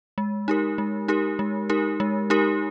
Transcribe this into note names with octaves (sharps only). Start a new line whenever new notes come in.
G#3
D#4 G4 A#4
G#3
D#4 G4 A#4
G#3
D#4 G4 A#4
G#3
D#4 G4 A#4